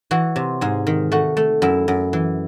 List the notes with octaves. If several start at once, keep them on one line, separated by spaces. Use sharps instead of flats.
E3 F#4
C3
G#2 G#4
D#3
A3 F#4
A3
F#2 E4
F#2
E3